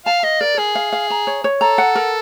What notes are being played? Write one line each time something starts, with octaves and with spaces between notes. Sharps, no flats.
F5 A5
D#5 F5
A#4 D5
G#4 A#4
F5
F5
A#5
C#5
C#5
A4 A#5
F#5
A#4